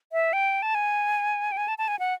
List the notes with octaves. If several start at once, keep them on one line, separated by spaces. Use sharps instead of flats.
E5
G5
A5
G#5
G5
G#5
A5
A5
G#5
F#5